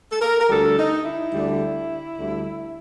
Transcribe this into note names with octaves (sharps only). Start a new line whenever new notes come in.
A4
A#4
A#4
D2 D3 G3 A4
D#4
E4
D2 D3 G3
D2 D3 G3